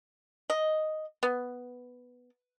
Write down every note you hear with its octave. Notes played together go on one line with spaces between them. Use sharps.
D#5
B3